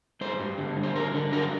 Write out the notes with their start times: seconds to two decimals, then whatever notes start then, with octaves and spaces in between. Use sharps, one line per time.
0.21 G2 C5
0.40 G2
0.58 D3
0.77 G2
0.83 C5
0.95 D3 A#4
1.14 D3
1.32 G2 A#4